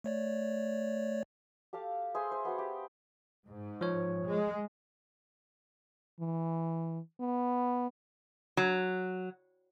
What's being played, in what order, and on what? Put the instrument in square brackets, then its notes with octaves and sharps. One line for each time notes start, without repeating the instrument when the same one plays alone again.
[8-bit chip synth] A3 C#5 D5
[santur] G4 A4 F5 D6
G#4 C5 E5 C6
C5
B3 F#4 C5
G4
[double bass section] G#2
[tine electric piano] F3 C#5
[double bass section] G#3
[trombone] E3
B3
[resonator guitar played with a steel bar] F#3